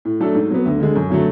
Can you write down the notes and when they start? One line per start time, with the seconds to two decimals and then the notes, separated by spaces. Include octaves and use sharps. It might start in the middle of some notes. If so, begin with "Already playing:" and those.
0.05 A2
0.20 F#3 A3 D4 A4
0.35 G#2
0.51 F#3 B3
0.65 D2
0.80 D3 G#3
0.96 F#2
1.10 D3 F#3 A3